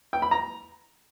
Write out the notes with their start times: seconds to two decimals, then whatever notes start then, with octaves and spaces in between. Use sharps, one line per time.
0.13 G5
0.22 B5
0.31 A#5